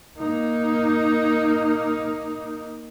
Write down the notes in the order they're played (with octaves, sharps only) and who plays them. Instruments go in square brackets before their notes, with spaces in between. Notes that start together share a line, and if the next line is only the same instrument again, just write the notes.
[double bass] A#3 D#4